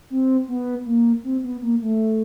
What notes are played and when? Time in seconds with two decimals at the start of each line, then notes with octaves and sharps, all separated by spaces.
0.10 C4
0.48 B3
0.86 A#3
1.24 C4
1.44 B3
1.62 A#3
1.82 A3